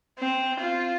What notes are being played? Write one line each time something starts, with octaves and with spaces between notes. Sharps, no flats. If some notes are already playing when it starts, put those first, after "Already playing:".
C4
F4